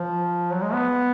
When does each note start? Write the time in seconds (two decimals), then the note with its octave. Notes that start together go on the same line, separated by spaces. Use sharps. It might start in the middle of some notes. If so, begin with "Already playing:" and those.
Already playing: F3
0.52 F#3
0.62 G#3
0.73 B3